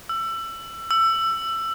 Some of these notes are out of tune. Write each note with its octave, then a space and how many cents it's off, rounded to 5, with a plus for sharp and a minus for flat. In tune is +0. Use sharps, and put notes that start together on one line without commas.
E6 +25
E6 +20